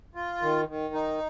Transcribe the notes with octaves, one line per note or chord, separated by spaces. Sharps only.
F4
D#3
D#3
D#4